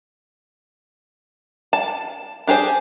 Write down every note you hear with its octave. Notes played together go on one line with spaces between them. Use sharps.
A5
D4 G4 G#4 C5